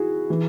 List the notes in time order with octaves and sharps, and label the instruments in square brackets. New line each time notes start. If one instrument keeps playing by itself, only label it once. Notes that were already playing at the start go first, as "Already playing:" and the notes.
Already playing: [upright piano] E4 F#4 G#4
E3